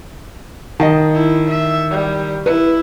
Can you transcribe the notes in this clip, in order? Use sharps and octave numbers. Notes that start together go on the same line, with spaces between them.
D#3 D#5 F5 A5
E4
E5
G3
E4 B4